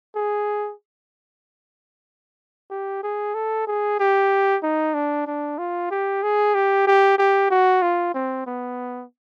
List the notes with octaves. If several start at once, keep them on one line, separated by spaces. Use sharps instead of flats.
G#4
G4
G#4
A4
G#4
G4
D#4
D4
D4
F4
G4
G#4
G4
G4
G4
F#4
F4
C4
B3